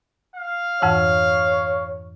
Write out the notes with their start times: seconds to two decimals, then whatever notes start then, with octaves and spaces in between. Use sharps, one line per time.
0.36 F5
0.82 F2 G#2 E3 C#5